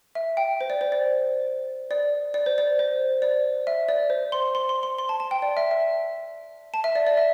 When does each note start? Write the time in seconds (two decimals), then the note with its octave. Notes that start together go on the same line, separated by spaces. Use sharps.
0.15 E5
0.37 G5
0.61 C5
0.70 D5
0.81 C5
0.92 D5
1.91 D5
2.34 D5
2.46 C5
2.58 D5
2.79 C5
3.22 D5
3.67 E5
3.89 D5
4.10 C5
4.32 C6
4.55 C6
4.69 C6
4.83 C6
4.98 C6
5.09 A5
5.20 A5
5.31 G5
5.42 D5
5.57 E5
5.71 E5
6.74 A5
6.84 E5
6.95 D5
7.07 D5
7.17 E5